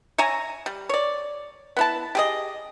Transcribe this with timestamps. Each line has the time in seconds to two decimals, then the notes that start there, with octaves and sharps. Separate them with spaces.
0.18 C#5 E5 G#5 A#5
0.66 G3
0.89 C#5 D5
1.77 B3 E4 A5
2.15 G4 G#4 D#5